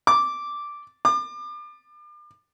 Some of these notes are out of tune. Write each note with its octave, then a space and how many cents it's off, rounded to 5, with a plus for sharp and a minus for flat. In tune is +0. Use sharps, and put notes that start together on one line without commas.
D6 -5
D6 +35